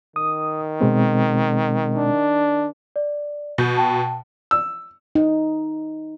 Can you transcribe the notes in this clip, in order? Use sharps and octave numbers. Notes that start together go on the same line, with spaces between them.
D#3 D#6
B2 G#3 C4
D4
D5
B2 G6
G5 A5
E6
D#4